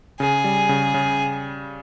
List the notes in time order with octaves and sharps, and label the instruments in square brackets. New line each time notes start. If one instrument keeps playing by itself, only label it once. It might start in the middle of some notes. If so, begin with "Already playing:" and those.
[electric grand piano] C#3 [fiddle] G#4
[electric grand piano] G3
C#3
C#3